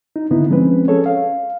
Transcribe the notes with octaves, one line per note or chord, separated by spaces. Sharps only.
D#4
G#2 D3 B3 D#4 E4
F3 G#3 C4 C#4 B4
C#4 G#4 A4 C#5
F5